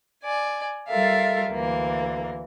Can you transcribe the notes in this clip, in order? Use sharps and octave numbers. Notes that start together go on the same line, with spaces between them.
D5 G#5
G3 F4 A4 A#4 E5 F5
D2 E3 A#3